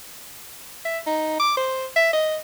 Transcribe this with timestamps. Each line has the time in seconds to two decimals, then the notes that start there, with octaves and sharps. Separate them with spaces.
0.85 E5
1.07 D#4
1.40 D6
1.57 C5
1.96 E5
2.13 D#5